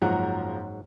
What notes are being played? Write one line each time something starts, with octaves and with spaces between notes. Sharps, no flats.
F#1 G#2 F3 F#3 F#5 A#5